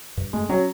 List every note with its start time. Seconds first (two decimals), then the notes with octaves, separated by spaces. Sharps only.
0.17 G2
0.33 G#3 A3
0.49 F#3 C#4